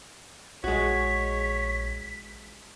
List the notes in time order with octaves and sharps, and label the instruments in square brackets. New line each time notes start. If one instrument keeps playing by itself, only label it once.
[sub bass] A#1 [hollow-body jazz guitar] G#3 F#4 [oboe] C#5 [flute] B6